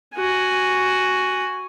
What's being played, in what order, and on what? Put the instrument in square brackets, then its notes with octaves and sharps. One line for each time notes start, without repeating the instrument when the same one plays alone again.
[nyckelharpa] F#4 G#5